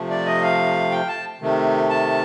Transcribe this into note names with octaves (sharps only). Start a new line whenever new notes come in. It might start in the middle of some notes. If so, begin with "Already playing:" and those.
Already playing: C3 F3 A3
D5
D#5
F5
G5
A5
C3 D#3 A3
A5